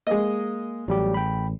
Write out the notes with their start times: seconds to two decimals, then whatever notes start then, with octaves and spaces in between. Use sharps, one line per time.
0.07 G#3 A#3 D#5 D#6
0.88 A1 F#3 G3 G4
1.14 G5 B5